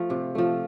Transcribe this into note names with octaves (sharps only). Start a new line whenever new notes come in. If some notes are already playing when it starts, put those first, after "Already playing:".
Already playing: F3 A3
C3
F3 A3